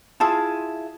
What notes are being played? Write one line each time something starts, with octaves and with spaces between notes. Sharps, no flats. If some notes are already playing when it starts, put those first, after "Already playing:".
E4 F4 G#4 A5